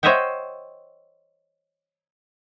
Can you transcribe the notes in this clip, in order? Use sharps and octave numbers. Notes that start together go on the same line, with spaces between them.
C5 C#5 D#5 E5 F#5 G5